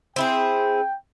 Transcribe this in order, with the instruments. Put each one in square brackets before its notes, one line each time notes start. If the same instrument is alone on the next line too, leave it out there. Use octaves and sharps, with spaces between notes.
[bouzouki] C4 E4 G#4 [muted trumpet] G5